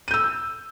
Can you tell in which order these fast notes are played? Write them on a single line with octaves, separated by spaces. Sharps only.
D#7 G6 E6